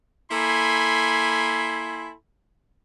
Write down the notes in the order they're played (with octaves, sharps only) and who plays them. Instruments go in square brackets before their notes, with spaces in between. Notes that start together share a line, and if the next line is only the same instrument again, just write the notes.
[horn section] A#3 E4 A4 G#5 B5 C6